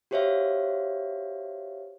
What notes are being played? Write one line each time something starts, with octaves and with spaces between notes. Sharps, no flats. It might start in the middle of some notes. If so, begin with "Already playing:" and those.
F#4 G4 C5 C#5 E5 F5